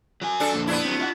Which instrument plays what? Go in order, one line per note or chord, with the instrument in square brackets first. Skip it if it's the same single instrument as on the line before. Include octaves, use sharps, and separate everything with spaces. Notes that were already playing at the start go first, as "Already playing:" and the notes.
[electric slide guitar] F#3 F#4 G#5
[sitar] D4 A4
[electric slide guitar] F2 A#2
[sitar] B3 D4 E4
[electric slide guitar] F#3 C4
F4 D#5 F#5